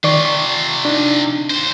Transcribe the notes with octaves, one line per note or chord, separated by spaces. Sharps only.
C3 D#3 F4 D5 C#6
C#6
D4 D#4
D#2 C5